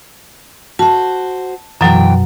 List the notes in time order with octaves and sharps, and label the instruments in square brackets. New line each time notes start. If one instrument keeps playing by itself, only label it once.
[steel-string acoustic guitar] F#4 C5 [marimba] A5
[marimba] F#2 B2 F#3 [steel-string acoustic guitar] E3 G5